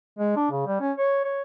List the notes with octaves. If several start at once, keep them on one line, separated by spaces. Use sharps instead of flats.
G#3
D4
C#3
G3
C#4
C#5
C#5